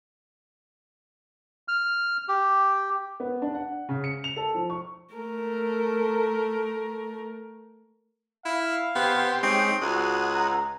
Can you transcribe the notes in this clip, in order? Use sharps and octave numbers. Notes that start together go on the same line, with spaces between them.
F6
G4
B3
D4
F#5
C#3
C#7
F7
A4
F3
C#6
A3 A#4
E4 F5
B3 G4 C5
G#3 C4 C#4 D#4 G4
C#2 F#4 F#5 D#6
A#5